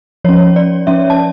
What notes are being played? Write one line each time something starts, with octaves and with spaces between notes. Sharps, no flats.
F3 C#4 C#5
D5
F3 C#4 E5
A5